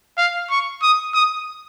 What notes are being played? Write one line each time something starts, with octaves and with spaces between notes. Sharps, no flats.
F5
C#6
D#6
D#6